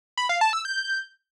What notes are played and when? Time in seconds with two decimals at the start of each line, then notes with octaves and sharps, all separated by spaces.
0.17 B5
0.29 F5
0.41 A5
0.53 E6
0.65 G6